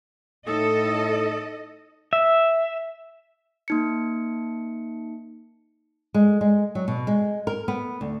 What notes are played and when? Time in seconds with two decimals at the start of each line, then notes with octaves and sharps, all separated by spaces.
0.47 A2 D#4 A4 D#5 D#6
2.13 E5
3.68 A#3 D#4 C#7
6.14 G#3
6.41 G#3
6.75 F#3
6.88 B2
7.07 G#3
7.47 A#4
7.68 B3
8.01 D2